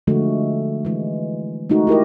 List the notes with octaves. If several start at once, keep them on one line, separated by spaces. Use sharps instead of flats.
D3 F3 G#3 A3 F#4
E3 G#3
G#3 A3 D#4 F#4
E4 G4 A#4 D#5